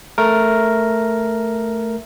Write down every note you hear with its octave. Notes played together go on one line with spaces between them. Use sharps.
A3 A#4